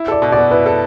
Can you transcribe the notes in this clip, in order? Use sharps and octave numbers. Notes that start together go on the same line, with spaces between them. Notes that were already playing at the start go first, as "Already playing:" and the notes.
Already playing: E4
A4 D5
B2
D5
B3
E4 B4
A4